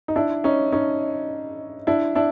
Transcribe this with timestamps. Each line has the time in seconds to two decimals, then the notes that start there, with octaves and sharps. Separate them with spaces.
0.08 D#4
0.16 D4 E4
0.44 C#4 D#4
0.72 C#4 D#4
1.87 D4 E4
2.15 D4 E4